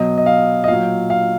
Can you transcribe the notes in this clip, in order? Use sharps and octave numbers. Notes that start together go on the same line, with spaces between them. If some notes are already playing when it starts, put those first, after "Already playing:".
Already playing: B2 F#3 D#5
D#5
F5
D#5
A#2 F#3 F5
F5